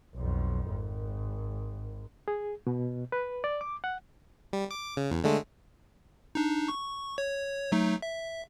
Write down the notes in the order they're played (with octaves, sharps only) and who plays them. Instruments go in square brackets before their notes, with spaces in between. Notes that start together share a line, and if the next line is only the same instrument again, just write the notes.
[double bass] B1 F2
G#1
[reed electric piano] G#4
B2
B4
D5
D6
F#5
[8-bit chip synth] G3
D6
C#3
E2
D3 G#3 A3
D4 D#4
C#6
C#5
F#3 A3 D#4
E5